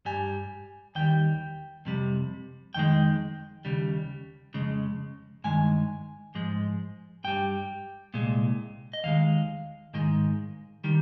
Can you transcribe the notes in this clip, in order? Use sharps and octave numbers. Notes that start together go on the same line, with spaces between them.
G2 G3 G#5
D#2 D#3 G3 G5
F2 C3 G3
F2 D#3 G#3 G5
D#2 C#3 G3
F2 C#3 G#3
G2 D#3 G#3 G#5
G#2 F3 G#3
G2 G3 G5
C2 A#2 G#3
D#5
D#2 D#3 G#3 F5
G#2 D#3 G#3
D#3 G3